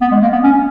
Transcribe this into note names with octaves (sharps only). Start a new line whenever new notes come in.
B3
G#3
A#3
B3
C#4